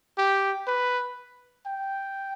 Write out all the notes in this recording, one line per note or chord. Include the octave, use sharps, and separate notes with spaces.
G4
B4
G5